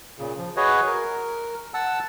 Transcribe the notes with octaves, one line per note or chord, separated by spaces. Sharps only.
A#2 C#3
F3
F#4 G#4 B4 C#5 D#5
A#4
F#5 A5 E6